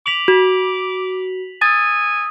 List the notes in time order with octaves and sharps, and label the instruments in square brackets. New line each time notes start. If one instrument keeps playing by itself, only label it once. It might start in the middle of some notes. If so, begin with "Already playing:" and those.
[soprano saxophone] D6 [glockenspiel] B6 F7 F#7
[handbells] F#4
[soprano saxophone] G#5 [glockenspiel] D#6 E6 [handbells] A6